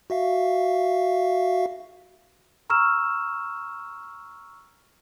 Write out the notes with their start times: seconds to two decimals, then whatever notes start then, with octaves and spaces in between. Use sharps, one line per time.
0.10 F#4 E5 F5
2.70 A#5 C#6 E6 F6 E7